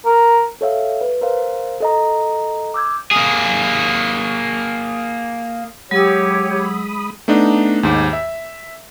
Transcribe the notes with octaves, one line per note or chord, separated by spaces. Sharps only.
A#4
A4 C#5 E5 F5
B4
A#4 C5 F5
A4 D#5 A#5
D6 E6 G6 G#6
A#3 G#4
F#3 G#3 G4 C#5 B5 D#6 E6
A3 B3 D4 D#4
D#2 G#2
E5